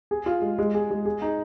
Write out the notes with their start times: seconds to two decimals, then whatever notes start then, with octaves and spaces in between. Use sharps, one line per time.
0.11 G#4
0.26 F4
0.42 G#3
0.58 G#3
0.75 G#4
0.91 G#3
1.06 G#4
1.22 D#4